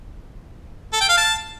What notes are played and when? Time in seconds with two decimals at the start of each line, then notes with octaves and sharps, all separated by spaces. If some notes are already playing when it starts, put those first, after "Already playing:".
0.93 A4
1.01 G5
1.09 F5
1.18 A5